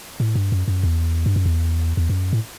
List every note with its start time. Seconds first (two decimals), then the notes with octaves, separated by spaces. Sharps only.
0.20 A2
0.35 G2
0.52 F#2
0.68 F#2
0.83 E2
1.26 G2
1.36 F#2
1.46 E2
1.97 E2
2.10 F#2
2.33 A2